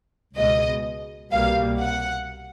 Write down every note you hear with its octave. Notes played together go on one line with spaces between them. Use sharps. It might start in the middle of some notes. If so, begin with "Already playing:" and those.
C#2 B2 G#3 D#5
C2 B2 G3 A#3 F5
F#5